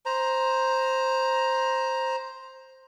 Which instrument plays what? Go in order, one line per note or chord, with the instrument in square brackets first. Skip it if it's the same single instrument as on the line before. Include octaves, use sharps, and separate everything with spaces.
[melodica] C5 A#5